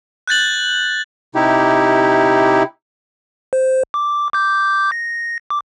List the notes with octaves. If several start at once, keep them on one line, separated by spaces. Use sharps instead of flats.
F#6 G6 A6 F#7
C3 D#4 E4 G4
C5
D6
D6 G6
A#6
D6